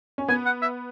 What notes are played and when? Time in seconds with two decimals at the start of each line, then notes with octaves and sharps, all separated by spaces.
0.18 C#4
0.28 B3 G#5
0.45 F#5
0.62 E5